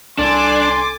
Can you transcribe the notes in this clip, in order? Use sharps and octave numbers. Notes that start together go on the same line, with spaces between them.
C2 D4 A4 G#5 C6 D6 A6